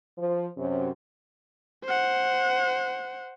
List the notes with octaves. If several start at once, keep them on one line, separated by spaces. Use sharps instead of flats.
F3
F#2 C3
C5 F#5